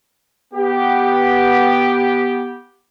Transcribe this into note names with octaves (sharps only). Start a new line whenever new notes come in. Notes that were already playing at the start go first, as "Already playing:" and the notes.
B3 G4